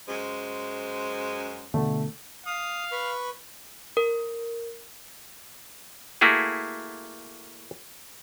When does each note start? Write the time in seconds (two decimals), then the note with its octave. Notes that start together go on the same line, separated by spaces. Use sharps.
0.07 F#2 G#3 C5
1.74 B2 D3 A3
2.46 F5 D#6
2.92 B4 B5 C#6
3.97 A#4
6.21 A3 A#3 E4 F#4 G#4